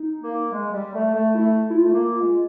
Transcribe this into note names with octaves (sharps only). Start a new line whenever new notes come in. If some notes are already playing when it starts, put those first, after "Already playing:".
Already playing: D#4
A#3
G#3
G3
A3
A3
A3 E4
E4
F4
A3
A#3
G#3